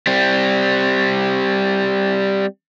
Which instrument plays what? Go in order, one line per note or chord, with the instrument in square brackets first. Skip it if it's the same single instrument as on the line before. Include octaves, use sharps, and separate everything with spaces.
[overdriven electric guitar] G3 C4